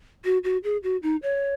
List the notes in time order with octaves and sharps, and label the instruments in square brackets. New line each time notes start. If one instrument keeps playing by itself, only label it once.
[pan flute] F#4
F#4
G#4
F#4
D#4
C#5